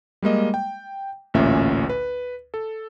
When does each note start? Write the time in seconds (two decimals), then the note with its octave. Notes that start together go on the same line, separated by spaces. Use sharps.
0.22 G3 G#3 A#3 D#5
0.54 G5
1.34 A1 D2 A#2 C#4 E5
1.89 B4
2.54 A4